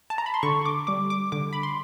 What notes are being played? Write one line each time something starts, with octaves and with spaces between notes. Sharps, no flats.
A5
A#5
B5
C6
D3 C#6
D6
G3 D6
D6
D3 D6
B5
C6